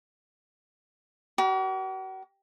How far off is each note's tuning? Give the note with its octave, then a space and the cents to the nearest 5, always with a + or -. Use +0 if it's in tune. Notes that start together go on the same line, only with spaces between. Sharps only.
F#4 +45 A#4 +45